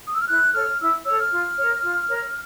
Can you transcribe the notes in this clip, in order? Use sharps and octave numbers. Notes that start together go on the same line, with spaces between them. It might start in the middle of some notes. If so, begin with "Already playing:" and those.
D#6
E6
F6
E4 F#6
A4 C#5 F6
E4 E6
A4 C#5 E6
F6
F4
A#4 C#5
F4
A#4 C#5